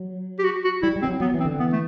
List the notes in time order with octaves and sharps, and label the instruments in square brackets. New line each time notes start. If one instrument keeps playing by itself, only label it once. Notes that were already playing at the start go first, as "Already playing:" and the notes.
Already playing: [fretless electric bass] F#3
[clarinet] G4
F#4
F#4
[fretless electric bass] G3 [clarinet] E4
[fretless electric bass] G3
[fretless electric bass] E3 [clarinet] C4
[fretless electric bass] F#3
[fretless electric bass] F#3 [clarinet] B3
[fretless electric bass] E3
[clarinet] C4
[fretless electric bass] D3
[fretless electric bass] E3 [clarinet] B3
[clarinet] A3